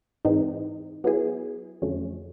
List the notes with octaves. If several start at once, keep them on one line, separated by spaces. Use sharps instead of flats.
G#2 E3 G#3 C4 D#4
F#3 B3 E4 G#4
F2 D3 F#3 A3 C#4